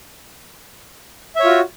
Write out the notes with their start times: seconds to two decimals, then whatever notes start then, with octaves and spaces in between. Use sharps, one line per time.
1.36 E5
1.40 C#5
1.44 F4
1.49 F#4